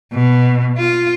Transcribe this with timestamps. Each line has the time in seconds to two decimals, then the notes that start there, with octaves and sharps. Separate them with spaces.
0.13 B2
0.78 F4